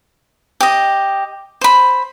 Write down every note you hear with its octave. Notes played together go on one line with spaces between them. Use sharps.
G4 D#5
C5 B5